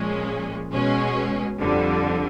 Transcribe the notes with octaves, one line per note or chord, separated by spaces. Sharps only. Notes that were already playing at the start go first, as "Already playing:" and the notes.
Already playing: A#2 F3 G#3 C#4
B2 G#3 C#4
F2 D3 G3